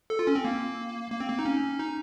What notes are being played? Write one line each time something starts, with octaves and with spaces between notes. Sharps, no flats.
A4
F4
C#4
C4
A#3
A#3
C4
A#3
D#4
C#4
D#4